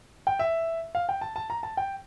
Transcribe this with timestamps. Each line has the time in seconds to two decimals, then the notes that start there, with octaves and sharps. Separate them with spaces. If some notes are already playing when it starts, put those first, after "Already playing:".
0.27 G5
0.39 E5
0.95 F5
1.09 G5
1.21 A5
1.36 A5
1.50 A#5
1.63 A5
1.77 G5